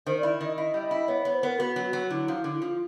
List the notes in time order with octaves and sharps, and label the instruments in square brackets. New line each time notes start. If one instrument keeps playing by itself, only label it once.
[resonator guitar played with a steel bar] D#3 [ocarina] C5
[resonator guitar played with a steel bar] E4 [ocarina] D5
[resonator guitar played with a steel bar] D#3 [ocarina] D#5
[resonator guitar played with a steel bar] E4 [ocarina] D#5
[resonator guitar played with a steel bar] G3
[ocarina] D#5
[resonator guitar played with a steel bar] E4
[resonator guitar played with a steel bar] B3 [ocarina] C#5
[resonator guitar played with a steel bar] B3 [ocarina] C#5
[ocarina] C5
[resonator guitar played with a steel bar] B3 [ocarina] A#4
[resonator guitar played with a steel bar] B3 [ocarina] F#4
[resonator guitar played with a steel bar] F#3
[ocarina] F#4
[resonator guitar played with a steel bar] F#3
[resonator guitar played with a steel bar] D3 [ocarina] E4
[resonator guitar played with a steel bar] F3
[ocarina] E4
[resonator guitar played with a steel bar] D3
[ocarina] E4
[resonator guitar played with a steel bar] F3 [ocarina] F4